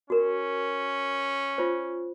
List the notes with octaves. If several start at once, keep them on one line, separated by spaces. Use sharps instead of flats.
C#4 F#4 A#4
F4 C5